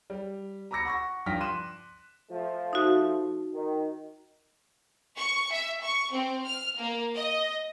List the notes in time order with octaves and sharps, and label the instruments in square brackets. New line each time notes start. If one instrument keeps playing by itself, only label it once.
[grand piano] G3
A#5 B5 D6 E6 A#6 C#7
F#5 C#6 A#6
G2 F3 G5 F6 A#6 B6
C6 D6 F#6 D#7 E7
[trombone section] F3 A3
[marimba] D#4 F#4
[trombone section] D#3
[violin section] C#6
E5
C#6
C4
F6
A#3
D#5